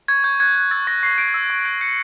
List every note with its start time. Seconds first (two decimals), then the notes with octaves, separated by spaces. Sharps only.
0.08 C#6 G#6
0.24 C#6 G6
0.40 F#6 G#6
0.55 F#6 G#6
0.71 E6 A6
0.87 C#6 A#6
1.03 C#6 C7
1.18 G6 D7
1.34 E6
1.50 C#6
1.65 G6 D7
1.81 G6 C#7